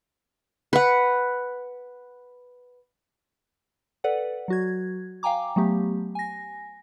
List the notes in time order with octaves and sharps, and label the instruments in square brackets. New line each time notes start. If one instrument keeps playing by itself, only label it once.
[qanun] B4 F#5
[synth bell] A4 B4 D5 F#5
F#3 F#4 G#6
F5 G5 G#5 A#5 D6
F#3 A3 B3 G4
G#5 A#6